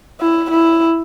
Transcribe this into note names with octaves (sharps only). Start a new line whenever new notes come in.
E4
E4